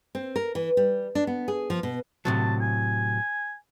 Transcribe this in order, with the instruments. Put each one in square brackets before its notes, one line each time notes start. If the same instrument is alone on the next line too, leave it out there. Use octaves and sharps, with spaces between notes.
[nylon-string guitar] C4
A#4
E3
G3
D4
B3
G#4
F3
B2
[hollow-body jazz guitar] A2 C3 F#3 [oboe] A5
[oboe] G#5